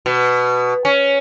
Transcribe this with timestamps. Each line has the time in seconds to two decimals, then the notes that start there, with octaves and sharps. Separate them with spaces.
0.06 B2
0.85 C#4